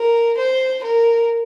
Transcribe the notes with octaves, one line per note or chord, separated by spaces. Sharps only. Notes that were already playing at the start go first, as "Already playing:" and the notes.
Already playing: A#4
C5
A#4